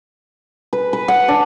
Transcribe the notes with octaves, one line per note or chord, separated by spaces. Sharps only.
B4
B4
F#5
D4